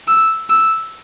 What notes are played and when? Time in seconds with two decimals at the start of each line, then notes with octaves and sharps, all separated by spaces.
0.08 E6
0.50 E6